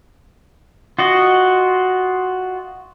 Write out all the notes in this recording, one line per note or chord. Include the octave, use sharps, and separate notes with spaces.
F4 F#4 D#5